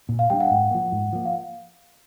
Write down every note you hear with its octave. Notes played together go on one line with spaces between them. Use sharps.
A#2
F5
G3 B3 D4 G5
F#5
G#2
F3 A#3
G#2
F3 A#3
F5